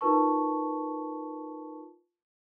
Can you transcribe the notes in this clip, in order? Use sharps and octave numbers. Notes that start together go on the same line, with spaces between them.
D#4 F4 A#4 B4 A5 C#6